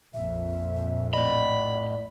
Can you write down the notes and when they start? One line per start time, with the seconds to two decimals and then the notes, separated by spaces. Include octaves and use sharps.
0.14 A#1 F2 E5
1.13 A2 D5 D#5 B5